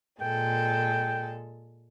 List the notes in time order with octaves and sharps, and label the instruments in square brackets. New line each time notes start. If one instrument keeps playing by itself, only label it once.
[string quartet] A#2 G#3 A4 [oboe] G5